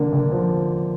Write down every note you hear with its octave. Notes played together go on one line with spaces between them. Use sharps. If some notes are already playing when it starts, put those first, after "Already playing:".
Already playing: D3 A#3
D3
F3